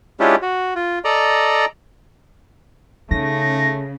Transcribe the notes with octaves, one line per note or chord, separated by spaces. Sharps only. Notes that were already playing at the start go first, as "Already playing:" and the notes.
G#3 C#4 D4 E4 F4 G4
F#4
F4
A4 D5 D#5 A#5
C#3 A3 D#4 A#6